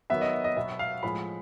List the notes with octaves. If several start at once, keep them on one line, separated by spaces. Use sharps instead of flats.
D#3 F#3 B3 E5
D#5
D#5
B2 F#3 B3 E5
F5
A2 F3 G#3 B5